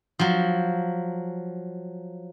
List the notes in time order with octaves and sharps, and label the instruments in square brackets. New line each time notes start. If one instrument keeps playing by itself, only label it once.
[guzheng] F3 F#3